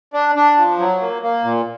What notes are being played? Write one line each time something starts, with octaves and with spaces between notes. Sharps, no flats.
D4
D4
F3
F#3
A#3
A#3
A#2